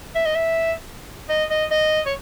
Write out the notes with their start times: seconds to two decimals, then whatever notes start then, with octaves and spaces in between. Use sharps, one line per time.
0.15 E5
0.26 D#5
0.35 E5
1.29 D#5
1.50 D#5
1.71 D#5
2.06 C#5